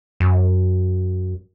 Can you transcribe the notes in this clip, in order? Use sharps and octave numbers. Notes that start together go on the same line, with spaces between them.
F#2